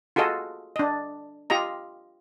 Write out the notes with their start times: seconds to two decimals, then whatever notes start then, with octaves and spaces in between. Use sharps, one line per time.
0.16 F4 F#4 G#4 A4 D#5
0.76 D4 D#5
1.50 F4 G4 D#5 A#5